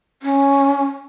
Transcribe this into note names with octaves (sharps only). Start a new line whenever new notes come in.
C#4